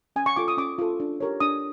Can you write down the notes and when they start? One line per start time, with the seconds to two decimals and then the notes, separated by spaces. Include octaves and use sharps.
0.16 C#4 G#5
0.26 C#6
0.36 F4 A4 D6
0.48 D#6
0.57 C#4 D6
0.79 F4 A4
1.00 D4
1.20 G4 A#4 C#5
1.40 D4 D#6